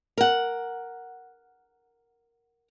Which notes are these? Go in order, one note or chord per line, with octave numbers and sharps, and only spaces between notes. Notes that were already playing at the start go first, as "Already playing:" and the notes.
A#4 F#5